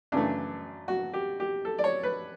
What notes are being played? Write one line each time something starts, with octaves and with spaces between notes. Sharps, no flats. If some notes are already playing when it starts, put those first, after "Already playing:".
F#2 C#3 E3 A3 D4
F#4
G4
G4
A4
D5
C#5
B4